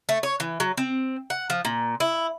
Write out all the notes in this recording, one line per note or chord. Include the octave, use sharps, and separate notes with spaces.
A3
C#5
E3
F#3
C4
F#5
F3
A#2
E4